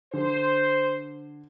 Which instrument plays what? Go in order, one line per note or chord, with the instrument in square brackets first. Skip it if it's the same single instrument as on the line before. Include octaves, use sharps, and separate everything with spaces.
[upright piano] D3 [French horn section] C5